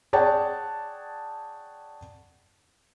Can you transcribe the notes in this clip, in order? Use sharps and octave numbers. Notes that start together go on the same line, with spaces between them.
G#4 C#5 D5 F#5 G5 A5